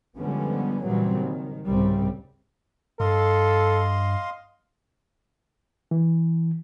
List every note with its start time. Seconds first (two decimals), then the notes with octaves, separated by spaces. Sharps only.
0.17 D3 F3 G3 G#3 B3 C#4
0.85 A#2 C#3 E3 F#3 G3 C4
1.20 D#3
1.67 C2 G#2 C#3 G3 C4
3.00 G2 A4 D#5 F5 C6
5.91 E3